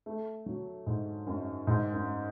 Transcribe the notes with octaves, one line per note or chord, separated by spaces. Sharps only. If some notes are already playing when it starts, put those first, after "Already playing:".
A3
F#3
G#2
F#2
G#2
F#2